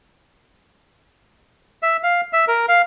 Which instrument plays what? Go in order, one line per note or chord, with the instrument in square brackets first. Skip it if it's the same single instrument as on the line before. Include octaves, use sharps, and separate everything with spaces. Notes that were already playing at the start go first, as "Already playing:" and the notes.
[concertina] E5
F5
E5
A#4
F5